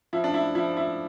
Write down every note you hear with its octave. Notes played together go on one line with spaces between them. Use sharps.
F3 E4
D4
E4
F3 E4
E4